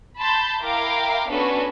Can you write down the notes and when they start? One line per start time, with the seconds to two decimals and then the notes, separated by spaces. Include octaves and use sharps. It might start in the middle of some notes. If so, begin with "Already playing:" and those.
0.18 A5 B5 C6 G6
0.62 E4 A#4 F5 G5 A#5 D6
1.29 B3 C#4 D4 F#4 A4 B4